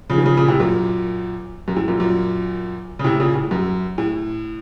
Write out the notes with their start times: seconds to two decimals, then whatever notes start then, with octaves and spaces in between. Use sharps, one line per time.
0.10 C#3 F3
0.18 D#3
0.25 C#3 F3
0.37 A#2 C#3
0.48 A2 C3
0.60 F#2 A#2
1.68 F#2
1.76 A2
1.88 F#2 A#2
2.00 F#2 A#2
2.99 C#3
3.04 A2 C3
3.20 A#2 C#3
3.35 A2
3.51 F#2
3.98 A2